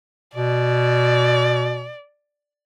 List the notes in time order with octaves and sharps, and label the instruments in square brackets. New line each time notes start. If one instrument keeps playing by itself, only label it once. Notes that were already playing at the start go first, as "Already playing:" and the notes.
[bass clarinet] B2 [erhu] D5